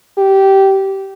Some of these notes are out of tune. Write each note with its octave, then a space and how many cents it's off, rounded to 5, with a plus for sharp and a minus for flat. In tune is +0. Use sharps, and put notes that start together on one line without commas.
G4 -15